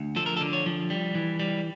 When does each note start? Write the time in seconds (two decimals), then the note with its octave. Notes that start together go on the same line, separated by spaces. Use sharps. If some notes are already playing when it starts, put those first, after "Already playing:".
Already playing: D2
0.16 F3 A4
0.26 A#4
0.37 A4
0.41 D3
0.53 C#5
0.66 F3
0.90 G3
1.15 E3
1.40 G3